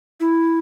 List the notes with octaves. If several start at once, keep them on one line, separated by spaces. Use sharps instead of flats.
E4